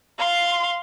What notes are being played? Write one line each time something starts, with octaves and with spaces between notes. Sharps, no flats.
F5 C6